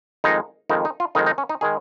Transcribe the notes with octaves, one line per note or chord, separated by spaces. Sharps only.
F2 D#3 G#3 D#4
F2 D#3 G#3 D#4
D#4
F4
F2 D#3 G#3 D#4
D#4
C#4
D#4
D#3 G#3 G#4